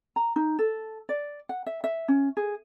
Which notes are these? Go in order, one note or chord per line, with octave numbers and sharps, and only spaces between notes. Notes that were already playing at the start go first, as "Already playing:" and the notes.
A#5
D#4
A4
D5
F#5
E5
E5
C#4
G#4